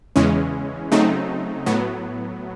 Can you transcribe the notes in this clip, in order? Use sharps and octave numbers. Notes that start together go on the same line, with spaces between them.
E2 C#3 E3 G#3 C#4
C#3 F#3 A3 C4 D#4
A2 F#3 B3